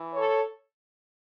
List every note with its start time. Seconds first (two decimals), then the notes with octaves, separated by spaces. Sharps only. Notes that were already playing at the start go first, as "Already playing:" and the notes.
Already playing: E3
0.13 A4 C#5